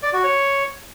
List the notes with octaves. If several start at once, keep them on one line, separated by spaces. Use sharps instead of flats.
D5
F#4
C#5